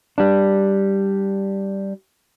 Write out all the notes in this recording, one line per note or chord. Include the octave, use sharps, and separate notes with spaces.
G3 D4